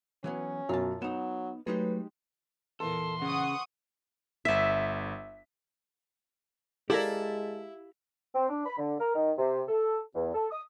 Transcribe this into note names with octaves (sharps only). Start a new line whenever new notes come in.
E3 F#3 B3 C#4
F#2 B2 F4 A5
F#3 B3 D#4 E7
F#3 G#3 A3 D#4 G4 B4 C#5
E2 A#2 A4 C6
C#3 F#5 C#6 D#6
G1 E5 B6
G#3 E4 G4 A4 A#4 D5 F5 A#5
C4
D4
B5
D3
A#4
D#3
C3
A4
E2
A4
D#6